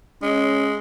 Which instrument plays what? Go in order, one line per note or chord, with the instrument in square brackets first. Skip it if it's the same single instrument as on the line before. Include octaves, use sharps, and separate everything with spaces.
[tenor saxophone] G#3 [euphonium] C#4